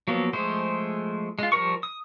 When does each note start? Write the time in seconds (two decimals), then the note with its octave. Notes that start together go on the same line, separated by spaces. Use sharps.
0.08 F3 F#3 A#3 B3
0.33 F3 G#3 A3 G#4 C5
1.39 G#3 F4
1.52 F3 G3 A#4 C#6
1.83 D#6